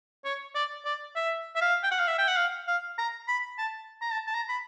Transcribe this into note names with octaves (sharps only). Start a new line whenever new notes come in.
C#5
D5
D5
E5
E5
F5
G5
F#5
F5
E5
G5
F#5
F5
F5
A#5
B5
A5
A#5
A5
A5
A#5
B5